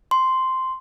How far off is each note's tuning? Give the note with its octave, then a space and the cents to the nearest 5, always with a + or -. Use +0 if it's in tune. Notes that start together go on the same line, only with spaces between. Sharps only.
C6 -5